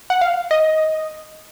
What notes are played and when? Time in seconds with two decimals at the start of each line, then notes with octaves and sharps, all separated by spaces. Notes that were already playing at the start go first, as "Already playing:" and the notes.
0.10 F#5
0.21 F5
0.51 D#5